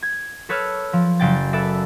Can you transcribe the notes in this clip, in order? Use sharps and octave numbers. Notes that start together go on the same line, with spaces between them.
G#6
A4 B4 C#5 E6 F6
F3
F#1 G5 A6
A4 B4 D5 E5